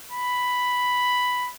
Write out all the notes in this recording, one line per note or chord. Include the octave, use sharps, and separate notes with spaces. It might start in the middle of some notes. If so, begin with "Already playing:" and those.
B5